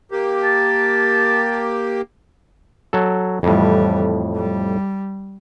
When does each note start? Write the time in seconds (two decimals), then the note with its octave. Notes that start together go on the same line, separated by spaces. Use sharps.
0.11 A#3 G4
0.44 A5
2.93 F#3 A4
3.43 F2 A2 E3 G3
4.36 G3